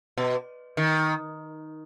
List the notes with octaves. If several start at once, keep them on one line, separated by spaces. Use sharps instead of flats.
B2
D#3